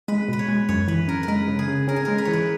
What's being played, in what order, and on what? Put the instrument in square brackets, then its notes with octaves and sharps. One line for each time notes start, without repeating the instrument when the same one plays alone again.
[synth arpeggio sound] G#3 [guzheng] B4
[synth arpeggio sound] B2 [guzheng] B4
[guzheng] C#5
[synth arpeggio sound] G#3
[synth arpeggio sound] F#2 [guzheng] C#5
[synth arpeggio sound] E3 [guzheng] B4
[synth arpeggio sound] F#2 [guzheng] A#4
[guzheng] A#4
[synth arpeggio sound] G#3 [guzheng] B4
[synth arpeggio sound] C#3
[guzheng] G#4
[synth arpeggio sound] C#3
[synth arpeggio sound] C#4 [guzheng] A#4
[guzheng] G#4
[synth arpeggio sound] G#3 [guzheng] A#4
[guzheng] B4
[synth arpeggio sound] E3 [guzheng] C#5
[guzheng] B4